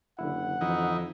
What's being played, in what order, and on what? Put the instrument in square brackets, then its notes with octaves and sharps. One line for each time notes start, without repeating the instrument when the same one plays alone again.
[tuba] F#1 [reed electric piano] D3 E4 [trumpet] F#5
[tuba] F2 [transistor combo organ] E3 D#4